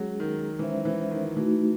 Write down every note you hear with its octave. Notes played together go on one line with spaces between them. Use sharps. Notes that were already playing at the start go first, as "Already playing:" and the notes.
Already playing: F#3 G#3 C#4 G#4
D#3
E3 G#3 C#4 E4 C5 E5
E3
D#3
E3 A3 D#4 F#4